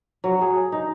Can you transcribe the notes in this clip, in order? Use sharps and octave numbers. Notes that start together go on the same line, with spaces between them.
F#3
G#4
D#4